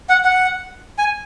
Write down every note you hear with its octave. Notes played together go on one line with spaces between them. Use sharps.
F#5
F#5
G#5